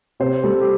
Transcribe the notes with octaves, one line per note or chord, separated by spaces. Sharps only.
C3 C5
G3 A4
G4